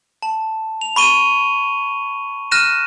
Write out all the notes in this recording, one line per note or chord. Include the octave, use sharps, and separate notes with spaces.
A5
F7
B5 C#6 D#7 G7
F6 F#6 A#6 D#7 E7